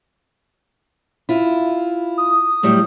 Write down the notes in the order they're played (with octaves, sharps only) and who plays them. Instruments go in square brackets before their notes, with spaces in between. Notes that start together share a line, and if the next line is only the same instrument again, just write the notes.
[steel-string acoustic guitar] E4 F4
[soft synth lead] D#6
[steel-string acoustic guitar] A2 F#3 G3